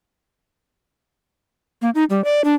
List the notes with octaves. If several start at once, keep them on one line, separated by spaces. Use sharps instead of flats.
A#3
D#4
G3
D5
D4